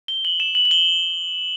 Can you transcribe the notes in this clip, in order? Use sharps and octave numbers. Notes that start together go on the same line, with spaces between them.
G7
F#7
E7
F#7
F#7
G7